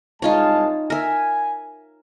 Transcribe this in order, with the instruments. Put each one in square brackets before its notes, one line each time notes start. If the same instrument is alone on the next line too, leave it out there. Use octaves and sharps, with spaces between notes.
[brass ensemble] C2 G#3 A5 [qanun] D#4 F4 C#5
[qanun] A#4 E5 [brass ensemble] G#5